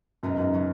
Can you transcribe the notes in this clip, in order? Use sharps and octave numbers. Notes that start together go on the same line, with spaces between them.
C#2 F#2 B2 G#3 B3 D#4
F#2
C#3 F#3 C#4